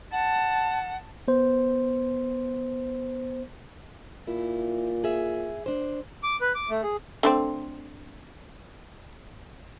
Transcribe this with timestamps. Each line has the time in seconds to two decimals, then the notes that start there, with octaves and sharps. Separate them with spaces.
0.12 F#5 A5
1.28 B3 C5
4.27 A#2 E4
5.04 G#4 E5
5.66 D4 C5
6.23 D6
6.41 B4
6.55 D6
6.70 A3
6.83 G#4
7.23 D3 A3 C4